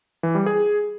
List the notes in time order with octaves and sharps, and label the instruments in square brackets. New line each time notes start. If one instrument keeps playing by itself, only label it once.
[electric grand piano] E3
G3
G#4